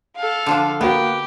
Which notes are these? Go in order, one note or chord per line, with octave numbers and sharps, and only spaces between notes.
A4 F5
D3 F3 D4
A#3 B3 F#4 G4